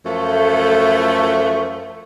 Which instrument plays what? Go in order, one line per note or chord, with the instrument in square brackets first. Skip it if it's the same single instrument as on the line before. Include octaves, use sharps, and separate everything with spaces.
[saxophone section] F#2 F3 A3